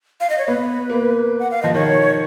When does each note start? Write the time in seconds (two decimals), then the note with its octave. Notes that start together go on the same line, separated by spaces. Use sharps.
0.21 F5
0.30 D#5
0.38 C#5
0.48 B3 B4
0.90 A#3
1.39 F#5
1.51 F5
1.62 F3 D#5
1.74 D#3 C#5